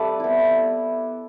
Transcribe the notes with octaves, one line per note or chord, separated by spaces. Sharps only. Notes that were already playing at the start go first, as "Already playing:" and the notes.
Already playing: G3 A3 C4 A4 B4 D5
B3 E4